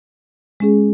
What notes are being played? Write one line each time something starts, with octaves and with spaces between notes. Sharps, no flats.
G#3 C#4 G#4